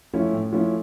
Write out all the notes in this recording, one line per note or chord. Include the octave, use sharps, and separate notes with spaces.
F3 A3 C#4 E4
A2
F3 A3 C#4 E4